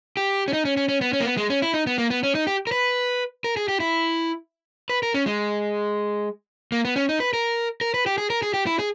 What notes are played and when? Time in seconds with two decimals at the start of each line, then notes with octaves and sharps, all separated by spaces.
0.17 G4
0.48 C#4
0.53 D#4
0.65 C#4
0.77 C#4
0.89 C#4
1.01 B3
1.13 C#4
1.20 A#3
1.25 B3
1.37 G#3
1.50 C#4
1.62 E4
1.74 D#4
1.87 B3
1.98 A#3
2.10 B3
2.23 C#4
2.35 D#4
2.47 G4
2.67 A#4
2.72 B4
3.44 A#4
3.57 G#4
3.68 G4
3.80 E4
4.89 B4
5.03 A#4
5.14 C#4
5.26 G#3
6.72 A#3
6.85 B3
6.96 C#4
7.09 D#4
7.20 B4
7.33 A#4
7.81 A#4
7.94 B4
8.06 G4
8.18 G#4
8.30 A#4
8.42 G#4
8.54 G4
8.67 E4
8.79 G#4